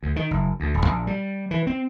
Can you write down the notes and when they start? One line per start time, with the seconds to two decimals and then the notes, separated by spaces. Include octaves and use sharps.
0.03 D2
0.16 D#3
0.31 F#1
0.60 D2
0.74 D#1
0.86 A#1
1.07 G3
1.51 E3
1.67 C4